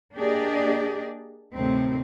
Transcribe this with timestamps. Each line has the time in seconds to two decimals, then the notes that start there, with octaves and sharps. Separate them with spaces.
0.15 A#3 D4 G4 G#4 D5 D#5
1.54 D2 A2 C3 D#3 C4